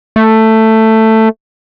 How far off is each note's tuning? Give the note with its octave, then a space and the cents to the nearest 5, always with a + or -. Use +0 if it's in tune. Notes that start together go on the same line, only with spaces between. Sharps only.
A3 +10